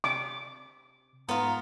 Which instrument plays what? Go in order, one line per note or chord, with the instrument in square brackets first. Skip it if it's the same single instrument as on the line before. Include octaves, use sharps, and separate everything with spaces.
[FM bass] C3 [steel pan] D6
[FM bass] G#2 [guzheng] B3 F4 [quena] A#5